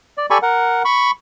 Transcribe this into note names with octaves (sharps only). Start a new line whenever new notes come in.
D5
G4 A4 D5 G#5 B5 C#6
A#4 F#5
B5 C#6